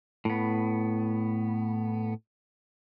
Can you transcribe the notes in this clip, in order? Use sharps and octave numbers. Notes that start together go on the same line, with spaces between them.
A2 B3